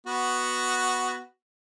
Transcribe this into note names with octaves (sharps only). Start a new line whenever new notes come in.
B3 F#4